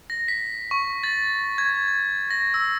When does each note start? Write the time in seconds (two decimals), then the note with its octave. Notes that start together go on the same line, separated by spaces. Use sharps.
0.10 A#6
0.28 B6
0.71 C#6
1.03 A6
1.58 G#6
1.88 G#6
2.30 A#6
2.54 E6